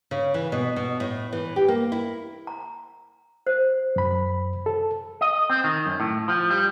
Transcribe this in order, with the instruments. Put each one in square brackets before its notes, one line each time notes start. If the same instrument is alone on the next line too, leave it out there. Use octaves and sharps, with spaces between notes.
[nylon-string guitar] C#3
E3
B2
B2
A2
E3
G4
A#3
E4
[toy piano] A#5
C5
[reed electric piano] F#2 B5
A4
[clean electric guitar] D#5
C4
D#3
F#2
A2
F3
G3